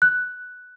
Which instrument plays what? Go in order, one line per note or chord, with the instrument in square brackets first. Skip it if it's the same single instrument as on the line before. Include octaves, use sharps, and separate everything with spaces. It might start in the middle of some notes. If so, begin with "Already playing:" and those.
[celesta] F#6